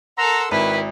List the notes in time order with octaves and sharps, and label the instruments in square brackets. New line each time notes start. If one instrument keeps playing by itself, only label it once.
[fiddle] A4 A#4 [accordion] F#5 C6 E6 [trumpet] A#5
[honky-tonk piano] G#1 [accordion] D#3 [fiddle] E4 [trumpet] B4